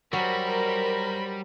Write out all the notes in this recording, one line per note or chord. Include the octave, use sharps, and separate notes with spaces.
F#3 G3 A#4 C5 B5